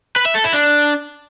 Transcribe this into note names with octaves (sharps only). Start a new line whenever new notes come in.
B4
E5
A4
E4
D4